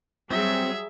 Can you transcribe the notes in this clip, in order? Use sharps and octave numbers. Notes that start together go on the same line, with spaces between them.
F#3 G3 C4 G#4 E5